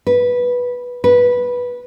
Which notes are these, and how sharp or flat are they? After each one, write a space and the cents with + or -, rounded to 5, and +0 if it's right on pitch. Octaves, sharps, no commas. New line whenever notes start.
B4 -10
B4 -15